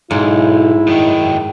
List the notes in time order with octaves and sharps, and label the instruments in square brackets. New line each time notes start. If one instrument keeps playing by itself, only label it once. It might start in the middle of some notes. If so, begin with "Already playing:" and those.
[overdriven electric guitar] B1 [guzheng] G#2 [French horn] E4
[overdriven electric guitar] F#2 D#3